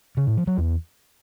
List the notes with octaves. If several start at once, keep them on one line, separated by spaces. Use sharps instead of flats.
C#3
A2
F3
F#3
E2